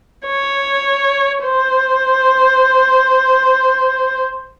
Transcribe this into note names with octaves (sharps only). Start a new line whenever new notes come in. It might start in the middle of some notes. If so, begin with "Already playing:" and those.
C#5
C5